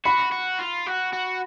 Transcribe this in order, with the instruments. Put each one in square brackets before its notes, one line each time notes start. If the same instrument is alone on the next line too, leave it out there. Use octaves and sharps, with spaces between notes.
[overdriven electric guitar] F#4 [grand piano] B5
[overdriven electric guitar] F#4
F4
F#4
F#4